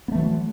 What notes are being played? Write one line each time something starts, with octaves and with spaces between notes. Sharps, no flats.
E3 F#3 A3 B3